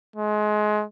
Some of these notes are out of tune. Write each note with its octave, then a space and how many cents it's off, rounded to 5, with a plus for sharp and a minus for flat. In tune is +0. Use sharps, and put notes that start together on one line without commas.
G#3 +25